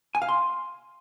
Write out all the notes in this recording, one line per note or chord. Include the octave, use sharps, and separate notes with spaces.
G#5
F5
C6